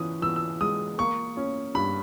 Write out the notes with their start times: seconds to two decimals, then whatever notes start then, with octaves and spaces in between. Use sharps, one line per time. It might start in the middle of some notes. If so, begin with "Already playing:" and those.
Already playing: E3 C#4 D#6
0.22 E3 E6
0.36 E6
0.61 G#3 D#6
0.98 A#3 C#6
1.37 C#4
1.75 G2 B5